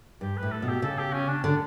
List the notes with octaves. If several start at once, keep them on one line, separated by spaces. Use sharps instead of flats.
G2 G4
B4
A2
A4
B2
G4
C#3 A4
G4
C#4
D4
D3 D4